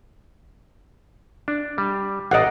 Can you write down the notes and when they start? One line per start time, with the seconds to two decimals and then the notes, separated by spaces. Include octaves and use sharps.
1.48 D4
1.78 G3
2.31 A1 D5 D#5 F#5